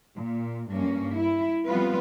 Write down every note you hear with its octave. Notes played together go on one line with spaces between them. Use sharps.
A#2
G2 A#3 C#4
E4
F3 G3 B3 C4 F4 B4